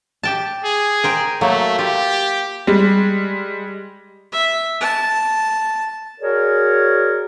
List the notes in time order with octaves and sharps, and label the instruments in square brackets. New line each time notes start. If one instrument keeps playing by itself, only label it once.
[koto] G4 G5 A5
[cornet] G#4
[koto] A#4 C5 G5
[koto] F#3 A#3 [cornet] A3
[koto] F4 [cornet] G4
[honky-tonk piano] G3 G#3
[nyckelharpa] E5
A5
[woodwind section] F#4 G#4 A#4 C#5 D5